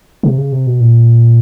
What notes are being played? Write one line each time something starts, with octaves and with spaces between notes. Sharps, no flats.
C3
C#3
C3
B2
A#2